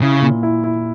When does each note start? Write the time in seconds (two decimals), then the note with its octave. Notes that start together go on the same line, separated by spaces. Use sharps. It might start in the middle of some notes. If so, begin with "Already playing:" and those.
0.01 C#3 E4
0.22 A#2
0.43 E4
0.64 E4